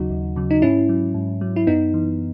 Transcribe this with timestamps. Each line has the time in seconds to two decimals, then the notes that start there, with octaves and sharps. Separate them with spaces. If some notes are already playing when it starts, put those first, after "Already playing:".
Already playing: D#2 C#3 F#3 D#4 F#4
0.10 D#2
0.36 C#3 F#3
0.51 D#4
0.62 G#2 C#4 E4
0.89 F#3
1.14 G#2
1.41 F#3
1.56 E4
1.67 F#2 B3 D#4
1.94 E3